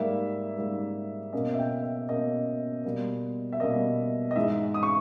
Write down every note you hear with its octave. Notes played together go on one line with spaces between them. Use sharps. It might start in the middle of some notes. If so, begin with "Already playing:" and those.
Already playing: G#2 G3 A#3 E5
G#2 G3 A#3
B2 A#3 C#4 D#5
E5
G5
E5
B2 A#3 C#4 D#5
B2 G3 A#3
E5
B2 G3 A#3 D#5
D#5
G#2 E3 G#3 E5
D#6
C#6